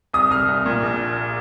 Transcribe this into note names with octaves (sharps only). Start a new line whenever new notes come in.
C2 D#6
C2 F6
C2
A#2
A#1